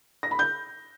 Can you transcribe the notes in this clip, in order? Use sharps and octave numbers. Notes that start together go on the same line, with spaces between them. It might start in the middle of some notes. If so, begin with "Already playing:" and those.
A#6
B5
G6